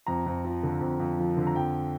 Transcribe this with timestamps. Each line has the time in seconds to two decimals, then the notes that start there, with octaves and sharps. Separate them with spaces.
0.06 F2 A#5
0.26 F2
0.44 F3
0.63 D3
0.81 F2
1.00 F2
1.18 F3
1.37 D3
1.47 A#5
1.55 F2 G5